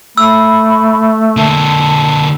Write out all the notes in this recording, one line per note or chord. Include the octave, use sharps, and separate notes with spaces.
A3 B5 E6
D3 A#3 A5